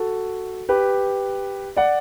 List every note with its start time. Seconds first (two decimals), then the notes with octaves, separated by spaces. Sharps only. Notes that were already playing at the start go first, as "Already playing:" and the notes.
Already playing: F#4 A4
0.69 G4 B4
1.77 D5 F#5